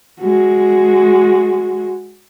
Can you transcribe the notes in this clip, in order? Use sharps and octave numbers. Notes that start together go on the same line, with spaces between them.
G#3 F#4